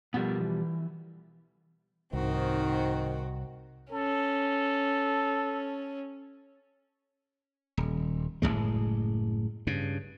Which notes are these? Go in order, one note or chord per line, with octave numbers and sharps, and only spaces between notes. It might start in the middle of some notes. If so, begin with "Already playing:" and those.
B2 F3 G3 B3 A4 A#4
E3
C2 G#2 D#3 C4 F#4
C#4 A4
D#1
F#1 F#2 A2 G#3
G2 C#3